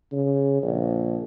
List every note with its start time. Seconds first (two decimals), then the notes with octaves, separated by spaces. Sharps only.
0.12 C#3
0.63 A#1